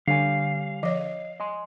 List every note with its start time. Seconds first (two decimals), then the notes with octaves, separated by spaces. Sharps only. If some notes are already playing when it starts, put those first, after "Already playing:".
0.08 D3 G3 C#5 F5 G#5
0.83 F3 C#5 D#5
1.40 D#5 G#5 C6